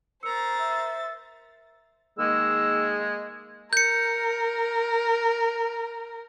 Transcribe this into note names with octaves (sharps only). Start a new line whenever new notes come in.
A#4 C5 A#5 E6 A6 C#7
E5
D#3 G#3 A#3 G#4 E6
A#4 G6 C#7